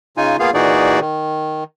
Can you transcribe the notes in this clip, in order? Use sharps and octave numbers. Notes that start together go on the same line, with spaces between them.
C#3 D#4 F4 G#5
A#3 B3 F4 G#4 F5
A#2 E3 D#4 F#4 G#4 D5
D#3